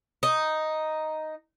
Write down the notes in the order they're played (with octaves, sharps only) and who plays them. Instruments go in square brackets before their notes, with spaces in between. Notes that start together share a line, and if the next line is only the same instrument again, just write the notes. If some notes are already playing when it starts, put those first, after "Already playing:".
[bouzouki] D#4